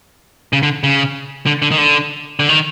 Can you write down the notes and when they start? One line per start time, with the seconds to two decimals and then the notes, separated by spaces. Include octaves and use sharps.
0.53 C#3
0.63 D3
0.84 C#3
1.46 D3
1.62 D3
1.71 D#3
1.78 D3
2.40 D3
2.49 D#3